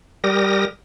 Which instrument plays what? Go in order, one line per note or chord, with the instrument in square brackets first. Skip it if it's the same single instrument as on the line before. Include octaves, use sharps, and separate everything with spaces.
[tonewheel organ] G3 G4 A#4 D#6 A#6